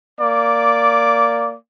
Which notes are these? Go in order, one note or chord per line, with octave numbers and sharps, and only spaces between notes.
A#3 D5 D6